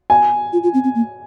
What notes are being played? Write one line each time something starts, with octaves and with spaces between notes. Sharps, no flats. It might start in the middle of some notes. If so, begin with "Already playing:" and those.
G#5
F4
F4
C4
C4
A#3